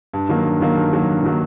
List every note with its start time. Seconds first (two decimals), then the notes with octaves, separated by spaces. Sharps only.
0.13 G2
0.29 D#3 F#3 A#3
0.45 G2
0.60 D#3 F#3 A#3
0.76 G2
0.92 D#3 F#3 A#3
1.08 G2
1.23 D#3 F#3 A#3